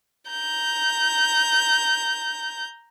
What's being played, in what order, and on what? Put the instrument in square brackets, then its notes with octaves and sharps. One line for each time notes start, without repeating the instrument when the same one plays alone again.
[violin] A#5 G6